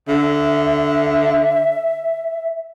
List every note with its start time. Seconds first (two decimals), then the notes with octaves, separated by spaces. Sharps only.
0.08 D3 E5